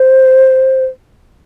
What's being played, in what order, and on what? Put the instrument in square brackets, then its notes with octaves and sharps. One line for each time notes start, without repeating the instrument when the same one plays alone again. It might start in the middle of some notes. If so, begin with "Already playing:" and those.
Already playing: [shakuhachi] C5